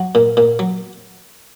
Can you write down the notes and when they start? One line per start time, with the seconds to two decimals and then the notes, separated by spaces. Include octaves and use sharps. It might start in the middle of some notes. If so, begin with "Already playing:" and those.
Already playing: F#3 F#4
0.15 A#2
0.37 A#2
0.59 F#3